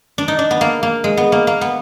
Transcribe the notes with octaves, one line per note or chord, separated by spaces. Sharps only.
D4
D#4
D4
B3
A#3
A#3
G#3
B3
A#3
A#3
B3